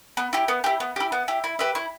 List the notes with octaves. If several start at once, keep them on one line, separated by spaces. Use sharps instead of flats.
B3
E4 G4
B3
E4 G4
B3
E4 G4
B3
E4 G4
E4
G4 B4 E5
E4